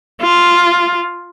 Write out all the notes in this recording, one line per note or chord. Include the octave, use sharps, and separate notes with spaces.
F4